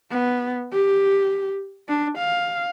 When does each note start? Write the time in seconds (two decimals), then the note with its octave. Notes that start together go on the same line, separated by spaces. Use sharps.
0.11 B3
0.73 G4
1.89 D4
2.18 F5